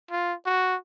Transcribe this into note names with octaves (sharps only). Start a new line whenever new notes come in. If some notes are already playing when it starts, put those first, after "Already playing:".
F4
F#4